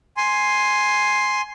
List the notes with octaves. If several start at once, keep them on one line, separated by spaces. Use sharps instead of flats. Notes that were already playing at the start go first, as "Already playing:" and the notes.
G#5 C6